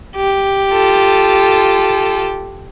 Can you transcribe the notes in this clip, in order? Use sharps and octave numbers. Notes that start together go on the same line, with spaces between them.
G4
F4 A4